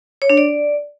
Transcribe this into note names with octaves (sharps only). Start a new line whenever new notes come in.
C#5
D4
D5